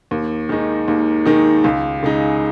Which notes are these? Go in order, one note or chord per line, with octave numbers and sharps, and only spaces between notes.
D#2
D#3 G#3 D#4
D#2
D#3 G#3 D#4
C#2
C#3 G#3 D#4